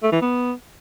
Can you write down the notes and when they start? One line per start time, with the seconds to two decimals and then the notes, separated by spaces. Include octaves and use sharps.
0.03 A3
0.12 E3
0.22 B3